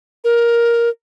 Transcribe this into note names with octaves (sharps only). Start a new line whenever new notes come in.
A#4